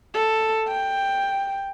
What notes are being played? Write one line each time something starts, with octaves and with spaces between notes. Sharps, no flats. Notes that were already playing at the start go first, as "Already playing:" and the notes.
A4
G5